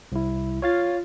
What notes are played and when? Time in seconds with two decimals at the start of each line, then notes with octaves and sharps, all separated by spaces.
0.12 C2 E4
0.62 F4 C#5 F5 A6